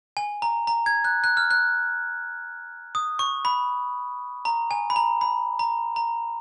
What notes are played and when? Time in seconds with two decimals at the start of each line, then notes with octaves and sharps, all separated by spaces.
0.17 G#5
0.42 A#5
0.67 A#5
0.86 G#6
1.05 F#6
1.24 F#6
1.37 F6
1.51 F#6
2.95 D#6
3.19 C#6
3.45 B5
4.45 A#5
4.71 G#5
4.90 B5
4.96 A#5
5.21 B5
5.59 A#5
5.96 A#5